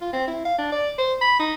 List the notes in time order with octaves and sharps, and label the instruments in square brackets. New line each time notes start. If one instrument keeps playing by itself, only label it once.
[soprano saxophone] F4
C4
E4
F5
D4
D5
C5
B5
D#4